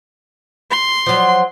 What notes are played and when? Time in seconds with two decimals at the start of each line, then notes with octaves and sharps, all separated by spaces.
0.71 C6
1.06 F3 F#3